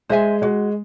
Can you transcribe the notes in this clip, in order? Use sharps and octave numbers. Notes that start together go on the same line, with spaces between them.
G#3 C5 E5 G#5
G#3 F#4